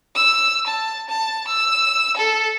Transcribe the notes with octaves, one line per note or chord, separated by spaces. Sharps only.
E6
A5
A5
E6
A4